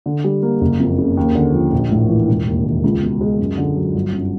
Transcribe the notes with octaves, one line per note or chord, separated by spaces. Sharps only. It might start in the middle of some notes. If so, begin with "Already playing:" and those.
D3
G3
A#3
F#1
F2
C#3
D#2
D3
F3
A#1
A2
E3
E1
D#2
D#3
C#2
B2
G#3
F#2
D3
F#3
G1
F#2